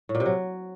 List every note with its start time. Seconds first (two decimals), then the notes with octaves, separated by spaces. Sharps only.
0.09 A2
0.15 A#2
0.20 C3
0.26 F#3